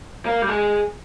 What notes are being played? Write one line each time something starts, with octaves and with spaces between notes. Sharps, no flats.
A#3
G3
G#3